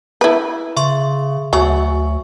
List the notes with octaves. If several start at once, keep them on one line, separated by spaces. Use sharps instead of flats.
E4 B4
C#3 E5 C6 C#6
D2 F#3 E5 G#5 C#6